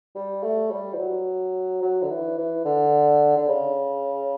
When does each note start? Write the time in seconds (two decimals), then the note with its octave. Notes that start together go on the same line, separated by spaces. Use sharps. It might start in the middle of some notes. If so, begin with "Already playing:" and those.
0.15 G3
0.43 A3
0.71 G3
0.93 E3
0.99 F#3
1.82 F#3
2.02 D3
2.10 E3
2.38 E3
2.65 D3
3.37 D3
3.49 C#3